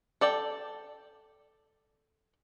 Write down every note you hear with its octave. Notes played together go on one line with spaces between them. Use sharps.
A4 D5 G5